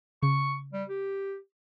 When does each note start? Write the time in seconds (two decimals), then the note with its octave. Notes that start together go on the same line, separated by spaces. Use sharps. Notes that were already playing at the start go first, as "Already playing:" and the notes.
0.23 C#3 C#6
0.73 G3
0.89 G4